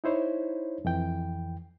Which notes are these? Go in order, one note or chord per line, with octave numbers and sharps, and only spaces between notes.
D#4 E4 C5 C#5
F2 E3 G5